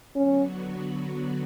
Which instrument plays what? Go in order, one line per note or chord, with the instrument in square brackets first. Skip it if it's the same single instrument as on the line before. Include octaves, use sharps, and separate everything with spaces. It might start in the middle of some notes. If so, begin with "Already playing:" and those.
[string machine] D3 F#3 B3 F#4 [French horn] C#4